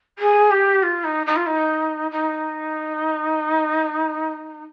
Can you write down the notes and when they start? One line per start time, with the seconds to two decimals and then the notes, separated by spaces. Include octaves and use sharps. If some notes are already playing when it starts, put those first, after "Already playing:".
0.18 G#4
0.50 G4
0.82 F4
1.04 D#4
1.26 D#4
1.35 F4
1.46 D#4
2.11 D#4